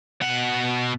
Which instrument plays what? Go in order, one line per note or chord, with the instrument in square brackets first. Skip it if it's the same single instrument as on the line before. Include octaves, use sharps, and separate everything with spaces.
[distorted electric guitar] B2 F#5